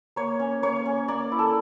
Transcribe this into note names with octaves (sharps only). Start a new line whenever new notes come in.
A#3 C#5
C#4
A#3 C#5
C#4
A#3 D5
E4
A4